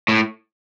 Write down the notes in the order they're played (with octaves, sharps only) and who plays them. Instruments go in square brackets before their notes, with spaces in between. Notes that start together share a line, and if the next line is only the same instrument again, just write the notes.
[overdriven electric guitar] A2